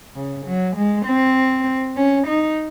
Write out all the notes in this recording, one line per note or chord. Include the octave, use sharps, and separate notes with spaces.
C#3
F#3
G#3
C4
C#4
D#4